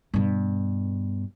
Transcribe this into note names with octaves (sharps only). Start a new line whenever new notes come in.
G2 B2